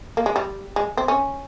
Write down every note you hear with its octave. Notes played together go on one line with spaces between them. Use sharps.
A#3
G#3
G3
G#3
C4
C#4